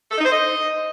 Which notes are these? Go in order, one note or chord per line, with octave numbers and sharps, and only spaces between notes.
A4
D#4
C5
D#5